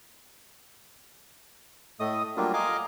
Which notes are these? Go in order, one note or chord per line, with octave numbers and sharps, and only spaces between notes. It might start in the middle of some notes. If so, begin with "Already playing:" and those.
A2 A3 D#5 D#6
F#3 G3 A3 A#3 D4 F4
D#5 F5 G#5 A#5 D6